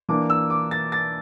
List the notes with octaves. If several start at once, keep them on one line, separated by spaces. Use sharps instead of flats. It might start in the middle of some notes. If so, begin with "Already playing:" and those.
E3 A#3 D4 D6
E6
D6
A6
A6